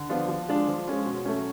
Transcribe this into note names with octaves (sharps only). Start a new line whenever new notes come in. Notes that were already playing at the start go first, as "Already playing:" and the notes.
Already playing: D3
F3 B3 D4 F4
F3
G#3 D4 F4
F3
G#3 C#4 F4
B2
F#3 A3 C#4